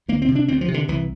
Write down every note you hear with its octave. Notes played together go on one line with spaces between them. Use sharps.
D2 A#3
C4
C3
D4
D2 C4
F3
C3
D3
C2 E3